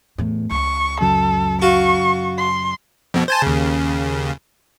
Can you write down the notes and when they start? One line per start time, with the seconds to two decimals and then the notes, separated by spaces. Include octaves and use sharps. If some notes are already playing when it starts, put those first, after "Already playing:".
0.18 E2 A2
0.51 C#2 C#6
1.01 F#2 C#3 F#3 A4
1.62 F4 F#4 C#6
2.38 C6
3.14 F2 B2
3.28 C5 G#5 A5
3.42 D#2 C#3